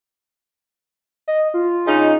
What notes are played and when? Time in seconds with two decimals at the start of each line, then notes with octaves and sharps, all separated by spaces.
1.28 D#5
1.54 F4
1.87 C#3 D#4